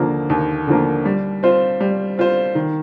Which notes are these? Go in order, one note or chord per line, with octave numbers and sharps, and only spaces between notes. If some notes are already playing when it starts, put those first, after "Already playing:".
Already playing: D#2 D3 F3 A#3
D#2
D3 F3 A#3
G3
C4 F4 C5
G3
C4 F4 C5
D#3